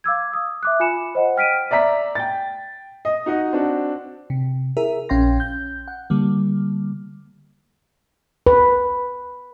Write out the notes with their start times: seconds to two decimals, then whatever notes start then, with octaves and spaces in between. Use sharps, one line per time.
0.04 F5 D6 E6 G#6
0.33 D#6
0.63 E5 D6 F#6
0.80 F4 G#5 B5 C#7 E7
1.15 C5 D#5 F#5
1.36 G5 F6 B6 D7 D#7
1.71 D5 E5 A#5 B6
2.15 G5 A6
3.05 D#5
3.26 D#4 F#4 D#5
3.53 C4 D4 F#4
4.30 C3
4.77 E4 G#4 A#4 E5
5.09 A#1 C#4 F5 G5 C6 A#6
5.40 G6
5.88 F#5
6.10 D3 G3 A#3
8.47 B4